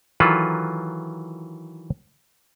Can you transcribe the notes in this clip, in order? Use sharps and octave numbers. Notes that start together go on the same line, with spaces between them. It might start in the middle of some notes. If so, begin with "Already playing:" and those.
D#3 E3 F#3 F4 A4 B4